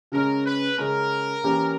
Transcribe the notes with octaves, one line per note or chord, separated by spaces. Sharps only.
C#3 G#3 C#4 A#4
B4
C#3 G#3 C#4 A#4
E3 A#3 C#4 G4